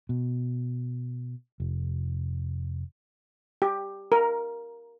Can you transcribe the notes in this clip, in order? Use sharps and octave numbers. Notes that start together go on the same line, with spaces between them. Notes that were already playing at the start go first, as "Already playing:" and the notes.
B2
F1
G4
A#4